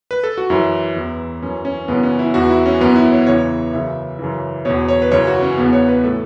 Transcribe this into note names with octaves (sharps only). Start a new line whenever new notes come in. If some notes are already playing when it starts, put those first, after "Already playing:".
B4
A4
F#4
F#2 E3 E4
E2 E3
F#2 E3 C#4
C#4
F#2 C#3 E3 B3
C#4
E4
E2 E3 F#4
E4
C#4
F#2 E3 B3
E4
C#5
E2 C#3 E3 C#5
F#2 C#3 E3 E5
F#2 C#3 E3
E2 B2 C#5
C#5
B4
F#2 C#3 E3 C#5
F#4
C#4
E2 C#3 E3 B3
C#5
B4
A2 E3 A4